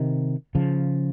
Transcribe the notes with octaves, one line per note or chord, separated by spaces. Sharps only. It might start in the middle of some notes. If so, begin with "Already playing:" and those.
Already playing: C3 D#3
C#3 F3